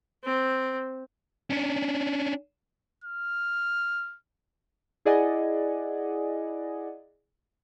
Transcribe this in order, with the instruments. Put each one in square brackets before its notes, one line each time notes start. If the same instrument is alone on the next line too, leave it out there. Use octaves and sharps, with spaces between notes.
[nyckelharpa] C4
[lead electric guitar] C#4 D4
[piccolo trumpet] F6
[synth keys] E4 G#4 D5 D#5 F#5 G#5